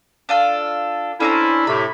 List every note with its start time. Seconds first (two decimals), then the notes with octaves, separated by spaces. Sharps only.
0.29 D4 F4 A4
1.20 C#4 D4 E4 A4 C5 A#5
1.67 A2 C3 B5